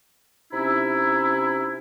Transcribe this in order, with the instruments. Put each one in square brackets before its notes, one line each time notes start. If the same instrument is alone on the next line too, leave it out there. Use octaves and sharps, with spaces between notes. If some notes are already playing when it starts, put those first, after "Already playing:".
[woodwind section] C3 C#4 D#4 E4